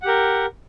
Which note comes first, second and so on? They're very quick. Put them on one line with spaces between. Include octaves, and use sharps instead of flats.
F#5 G4 A#4